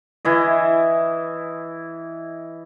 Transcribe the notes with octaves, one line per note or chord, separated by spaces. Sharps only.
E3 E4 D#5